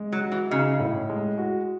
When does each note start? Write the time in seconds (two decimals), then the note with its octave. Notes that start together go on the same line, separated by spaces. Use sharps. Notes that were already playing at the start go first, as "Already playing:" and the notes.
Already playing: G#3
0.12 F#3
0.22 F#4
0.32 E3
0.51 C#3 D#4
0.80 A2
1.10 G#3
1.38 F#4